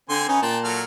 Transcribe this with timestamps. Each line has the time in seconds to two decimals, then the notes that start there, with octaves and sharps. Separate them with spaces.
0.09 D3 C4 G#5 C6
0.29 B3 C#4 D#4
0.42 A#2 G5 A5
0.64 F#3 A4 F6